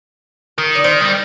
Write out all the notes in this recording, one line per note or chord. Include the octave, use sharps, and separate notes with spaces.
D#3 A#4
D5
D#3 C5
G3